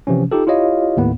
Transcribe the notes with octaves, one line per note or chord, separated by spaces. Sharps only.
C3 E3 F3 C#4
D#4 F4 G4 A4
E4 F4 G4 C#5 D#5 F5
D#2 A2 B3